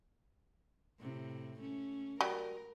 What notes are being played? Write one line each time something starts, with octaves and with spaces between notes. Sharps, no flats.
A2 C3
A3 C#4
F#3 G3 A#4